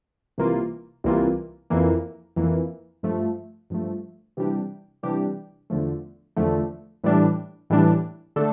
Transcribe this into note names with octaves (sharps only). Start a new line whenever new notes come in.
C2 C3 E3 A#3 F4
C2 C3 E3 A#3 F4
F2 E3 A#3
F2 E3 A#3
G2 F3 A3
G2 F3 A3
C3 E3 G3 D4 G4
C3 E3 G3 D4 G4
E2 D3 F3 A3
E2 D3 F3 A3
A2 E3 G3 D4
A2 E3 G3 D4
D3 A3 D4 A4